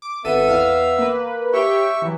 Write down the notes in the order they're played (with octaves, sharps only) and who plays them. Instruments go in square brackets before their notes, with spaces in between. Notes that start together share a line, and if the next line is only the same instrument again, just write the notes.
[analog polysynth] D6
[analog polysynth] G#1 A4 D#7 [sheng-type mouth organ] B3 E5 E6
[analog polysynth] E2 F5
A#3 B4
[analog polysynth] G4 C#5 G5 [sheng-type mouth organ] E5 C#6
[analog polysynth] E3 F#3